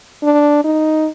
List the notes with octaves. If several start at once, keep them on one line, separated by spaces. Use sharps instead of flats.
D4
D#4